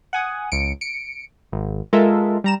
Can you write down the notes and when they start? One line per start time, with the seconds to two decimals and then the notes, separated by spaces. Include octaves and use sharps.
0.13 F#5 G#5 D#6
0.52 C#2 C#7 D7
0.81 C#7 D7
1.52 G#1
1.93 G#3 F4 A4 A#4 E5
2.44 G3 A#5 E7